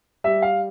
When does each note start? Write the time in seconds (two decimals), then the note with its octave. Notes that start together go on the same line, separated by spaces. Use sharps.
0.24 G3 E5
0.42 F5